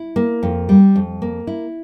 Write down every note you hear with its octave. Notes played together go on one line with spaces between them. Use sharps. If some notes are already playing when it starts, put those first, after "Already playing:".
Already playing: E4
A#3
F2
G3
F2
A#3
E4